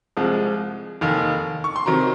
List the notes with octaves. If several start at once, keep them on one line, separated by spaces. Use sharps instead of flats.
C2 C3 F3 G#3
F1 D#2 D#3
C#6
C6
C3 D#3 F#3 A#5